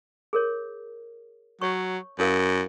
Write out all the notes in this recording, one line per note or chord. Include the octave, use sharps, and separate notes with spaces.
G#4 A#4 C#5
F#3 C#5 C#6
F#2 E4 A#4 F5